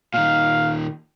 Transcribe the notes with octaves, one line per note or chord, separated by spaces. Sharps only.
A#2 D#3 F5